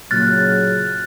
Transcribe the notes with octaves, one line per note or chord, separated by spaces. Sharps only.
A#2 C#3 F#3 F6 F#6 A6